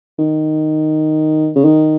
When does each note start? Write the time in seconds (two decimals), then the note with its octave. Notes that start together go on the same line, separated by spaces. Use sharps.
0.19 D#3
1.55 C#3
1.64 D#3